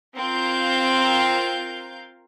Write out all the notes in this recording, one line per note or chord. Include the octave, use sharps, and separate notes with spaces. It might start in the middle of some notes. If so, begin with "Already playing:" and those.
C4 F4 A#4 F5 G6